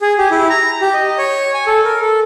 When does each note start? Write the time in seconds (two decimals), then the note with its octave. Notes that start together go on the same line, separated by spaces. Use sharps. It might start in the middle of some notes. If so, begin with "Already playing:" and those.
0.01 G#4
0.18 G4
0.31 E4
0.50 A#5
0.82 G4
0.94 D#5
1.18 C#5
1.54 G#5
1.67 A4
1.85 A#4
2.01 A4